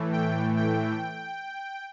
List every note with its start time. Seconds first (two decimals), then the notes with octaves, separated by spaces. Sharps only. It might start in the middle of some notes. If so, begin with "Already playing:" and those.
Already playing: A2 E3 A3
0.13 G5
0.57 G5